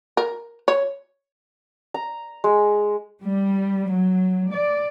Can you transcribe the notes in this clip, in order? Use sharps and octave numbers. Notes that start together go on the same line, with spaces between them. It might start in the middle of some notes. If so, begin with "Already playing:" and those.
A#4
C#5
A#5
G#3
G3
F#3
D5